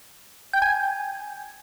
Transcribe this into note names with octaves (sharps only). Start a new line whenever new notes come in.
G5
G#5